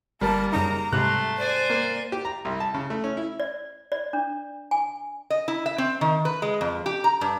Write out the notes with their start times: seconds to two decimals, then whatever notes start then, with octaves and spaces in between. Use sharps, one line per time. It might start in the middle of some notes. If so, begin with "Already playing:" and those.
0.21 G1 G3 A#3 A#4 A5
0.52 F#2 C#3 D#4 A#5
0.93 G#2 C3 G3 A3 C6 F#6
1.38 C5 D5 G#5
1.70 A#3
2.12 G4
2.25 A#5
2.45 C2
2.60 A5
2.74 C#3
2.90 A3
3.04 C#4
3.17 E4
3.40 D5
3.92 D5
4.13 D4
4.71 G#5
5.30 D#5
5.48 E4
5.66 E5
5.78 C4
6.01 D#3
6.25 B4
6.42 G#3
6.61 F2
6.86 G4
7.04 A#5
7.21 G2